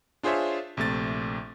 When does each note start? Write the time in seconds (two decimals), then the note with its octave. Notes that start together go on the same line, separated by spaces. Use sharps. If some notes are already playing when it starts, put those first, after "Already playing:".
0.23 D4 F4 G#4 C5 C#5 E5
0.77 A#1 C3 A3 A6